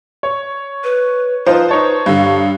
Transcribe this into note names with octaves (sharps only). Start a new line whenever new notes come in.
C#5
B4
F3 D#4 F4 B4 C5
D#4 C#5 A5
G2 D3 F5